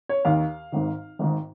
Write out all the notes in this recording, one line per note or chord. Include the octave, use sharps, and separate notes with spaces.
C#5
D#2 D#3 F5
G#1 G#2 D#3
G#1 G#2 D#3